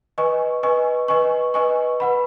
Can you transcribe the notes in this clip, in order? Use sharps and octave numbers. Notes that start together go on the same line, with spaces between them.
B4 D#5 G#5 C#6
B4 D#5 G#5 C#6
B4 D#5 G#5 C#6
B4 D#5 G#5 C#6
B4 F#5 B5